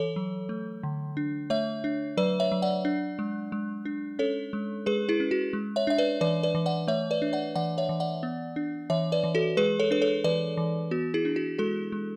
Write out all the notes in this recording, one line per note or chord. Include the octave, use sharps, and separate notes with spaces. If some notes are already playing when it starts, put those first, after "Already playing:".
Already playing: E3 A4 C#5
F#3
A3
D3
D4
A3 C#5 E5
D4
F#3 B4 D5
C#5 E5
F#3
D5 F#5
D4
G#3
G#3
D4
C#4 A4 C#5
G#3
G#3 G#4 B4
E4 G#4
C#4
F#4
G#3
C#5 E5
D4 E5
B4 D5
E3 B4 D5
B4 D5
E3
D5 F#5
A3 C#5 E5
B4 D5
D4
D5 F#5
E3 D5 F#5
C#5 E5
E3
D5 F#5
B3
D4
E3 C#5 E5
B4 D5
E3
F#4 A4
G#3 G#4 B4
A4 C#5
D4 B4
A4 C#5
E3 B4 D5
E3
B3 F#4
E4 G#4
D4
F#4
G#3 F#4 A4
G#3